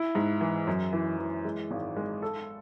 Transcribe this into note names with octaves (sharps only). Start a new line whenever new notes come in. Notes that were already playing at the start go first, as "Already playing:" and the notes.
Already playing: E4
G#2
E3
F#2
E3
E3
G#3
G#1
G#3
A4